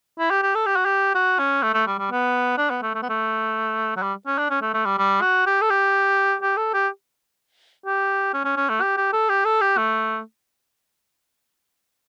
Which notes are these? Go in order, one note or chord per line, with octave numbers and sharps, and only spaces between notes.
E4
G4
G4
A4
G4
F#4
G4
F#4
C#4
A3
A3
G3
G3
B3
D4
B3
A3
A3
B3
A3
F#3
G3
C#4
D4
C#4
A3
A3
G3
G3
F#4
G4
A4
G4
G4
A4
G4
G4
C#4
C#4
C#4
A3
G4
G4
A4
G4
A4
G4
A3